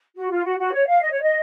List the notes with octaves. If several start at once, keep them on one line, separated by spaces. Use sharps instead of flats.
F#4
F4
F#4
F#4
C#5
F5
D#5
C#5
D#5